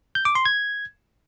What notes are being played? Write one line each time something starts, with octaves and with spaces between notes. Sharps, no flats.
G6
D6
C6
G#6